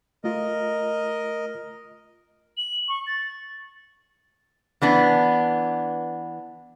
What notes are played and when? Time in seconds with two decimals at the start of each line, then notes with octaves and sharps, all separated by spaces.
0.24 A3 F4 A#4 D#5
2.57 F#7
2.88 C#6
3.07 A6
4.82 E3 B3 D4